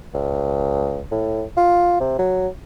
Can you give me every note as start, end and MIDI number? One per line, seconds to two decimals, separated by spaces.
0.14 1.06 37
1.11 1.44 45
1.57 1.99 65
2.00 2.17 48
2.19 2.48 54